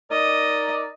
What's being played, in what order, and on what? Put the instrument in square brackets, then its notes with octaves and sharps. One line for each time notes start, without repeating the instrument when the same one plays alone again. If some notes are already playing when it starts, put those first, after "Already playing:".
[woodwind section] D#4 A#4 D5 [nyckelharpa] D#5